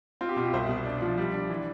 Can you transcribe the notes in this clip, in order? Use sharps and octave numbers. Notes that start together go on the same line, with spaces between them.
C4 F4
G4
B2 F4
G4
C2 C5 E5
B2
D4
F3
G3
D4
E3